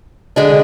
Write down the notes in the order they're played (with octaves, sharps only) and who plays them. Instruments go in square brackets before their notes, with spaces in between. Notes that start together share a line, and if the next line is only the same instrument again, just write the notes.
[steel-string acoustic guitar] D3 G#3 D4